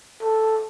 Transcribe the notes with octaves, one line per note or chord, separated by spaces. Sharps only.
A4